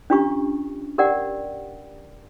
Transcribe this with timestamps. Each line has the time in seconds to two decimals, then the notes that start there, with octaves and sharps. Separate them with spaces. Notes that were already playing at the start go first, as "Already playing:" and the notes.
0.10 C#4 D4 F4 G4 C#6
0.98 G4 A#4 D5 F#5 G5